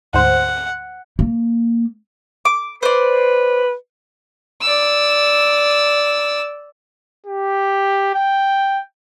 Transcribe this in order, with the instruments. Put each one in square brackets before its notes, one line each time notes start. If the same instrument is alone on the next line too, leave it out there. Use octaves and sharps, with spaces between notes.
[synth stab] D2 G#2 C5 [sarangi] F#5
[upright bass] A#3
[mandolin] D6
[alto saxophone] B4 [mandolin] C5 D5
[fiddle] D5 E6
[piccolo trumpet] G4
G5